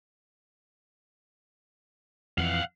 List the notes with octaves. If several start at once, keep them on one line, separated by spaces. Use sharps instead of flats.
F2 E3 F5 F#5